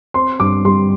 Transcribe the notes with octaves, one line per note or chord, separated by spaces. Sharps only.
C4 C6
G2 D6
G3 C6